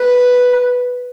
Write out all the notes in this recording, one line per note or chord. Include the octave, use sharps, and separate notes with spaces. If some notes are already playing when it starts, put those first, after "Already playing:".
Already playing: B4